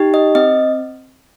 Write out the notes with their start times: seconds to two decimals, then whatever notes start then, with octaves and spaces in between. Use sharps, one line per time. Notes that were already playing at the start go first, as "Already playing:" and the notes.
Already playing: D#4 G4
0.14 D#5
0.35 C4 D#5